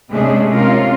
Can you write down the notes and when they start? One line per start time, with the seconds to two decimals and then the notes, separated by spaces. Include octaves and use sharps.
0.11 C3 G#3 A3 C#4 D4 G#4
0.51 C3 C#4 F4 A#4